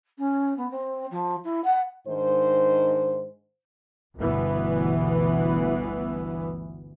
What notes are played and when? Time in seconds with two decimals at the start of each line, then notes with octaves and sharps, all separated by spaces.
0.18 C#4
0.57 B3
0.70 C4
1.10 F3
1.44 E4
1.64 F#5
2.08 G#2 D#3 D4 C5
4.17 G1 D2 B2 E3 B3